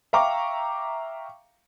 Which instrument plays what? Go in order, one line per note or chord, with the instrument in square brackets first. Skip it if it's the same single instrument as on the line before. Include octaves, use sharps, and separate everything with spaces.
[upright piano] E5 F5 G5 A#5 C#6 D6